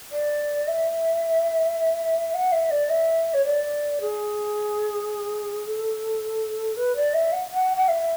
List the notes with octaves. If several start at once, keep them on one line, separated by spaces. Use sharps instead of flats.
D5
E5
F#5
E5
D5
E5
C#5
D5
G#4
A4
B4
D5
E5
F#5
F#5
F#5
E5